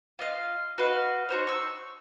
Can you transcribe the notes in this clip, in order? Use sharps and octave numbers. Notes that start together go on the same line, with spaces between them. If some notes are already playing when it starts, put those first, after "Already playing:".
F4 D#5 F5
F#4 B4 D#5 F5
D#4 F#4 C5 C#5
C#6 E6